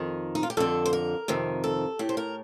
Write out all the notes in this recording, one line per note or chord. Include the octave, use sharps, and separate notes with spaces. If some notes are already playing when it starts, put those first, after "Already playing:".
Already playing: F2 D#3
D#4
F4
G4
F2 D3 A4
C5
A#4
F2 C3 D#3
A4
A2 G4
C5
A#4